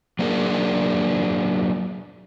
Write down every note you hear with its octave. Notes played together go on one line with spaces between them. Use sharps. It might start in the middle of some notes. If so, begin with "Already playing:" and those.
F#3 A#3 D4 G#4 A#4